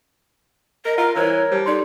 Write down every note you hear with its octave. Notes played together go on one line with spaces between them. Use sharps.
A#4 D#5
F4 A#4 F#5 A#5
E3 A#4 C5 C#5 D#6 E6
G3 C5 A5
D#4 A4 D5 C6